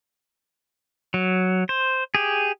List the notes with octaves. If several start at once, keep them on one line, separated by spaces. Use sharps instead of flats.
F#3
C5
G4 G#4